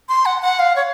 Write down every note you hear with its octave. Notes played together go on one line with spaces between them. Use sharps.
C6
F#5
F#5
F5
C#5